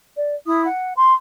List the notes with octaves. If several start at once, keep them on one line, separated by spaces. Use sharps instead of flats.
D5
E4 D#6
F#5
C6